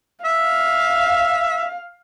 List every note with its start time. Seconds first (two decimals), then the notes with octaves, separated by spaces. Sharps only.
0.25 E5 F5